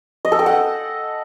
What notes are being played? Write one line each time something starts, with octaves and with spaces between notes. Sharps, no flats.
D#5
A4
G5
F#5